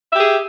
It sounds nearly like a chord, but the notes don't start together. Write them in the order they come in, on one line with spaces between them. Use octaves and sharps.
E5 G4 G#4